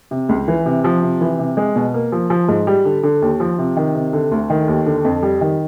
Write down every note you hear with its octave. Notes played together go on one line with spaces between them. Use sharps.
C3
C#2
E3
C3
F3
C3
E3
C3
G#3
B2
A#3
F3
F3
G#2
G3
D3
D3
D#2
F3
C3
D#3
C3
D3
D2
D#3
D#2
D3
F2
G3
D#3